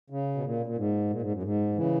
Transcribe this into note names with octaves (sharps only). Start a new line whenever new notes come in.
C#3
B2
A#2
A#2
G#2
A#2
G#2
F#2
G#2
C#3 E3